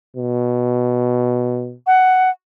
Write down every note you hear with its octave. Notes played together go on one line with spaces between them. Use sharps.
B2
F#5